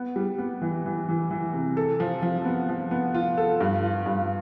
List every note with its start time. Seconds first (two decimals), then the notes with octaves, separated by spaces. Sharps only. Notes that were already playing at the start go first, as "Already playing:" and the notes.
Already playing: B3
0.16 G3
0.38 B3
0.62 E3
0.86 E3
1.09 E3
1.31 E3
1.53 C3
1.77 A4
2.00 F3
2.22 F3
2.45 B3
2.69 F3
2.91 B3
3.14 F4
3.38 A4
3.60 G2
3.83 F4
4.06 G2